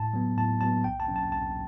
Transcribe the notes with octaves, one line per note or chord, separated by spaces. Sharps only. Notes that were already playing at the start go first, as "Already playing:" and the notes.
Already playing: A2 A5
F#3 B3
A2 A5
F#3 B3 A5
B1 G5
A5
B2 F#3 C#4
A5
B1 A5